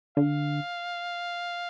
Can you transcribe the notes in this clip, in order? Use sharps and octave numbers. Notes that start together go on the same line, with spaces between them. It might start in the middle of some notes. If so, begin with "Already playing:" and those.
D3 F5